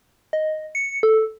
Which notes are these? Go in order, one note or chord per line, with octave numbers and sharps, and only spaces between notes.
D#5
C#7
A4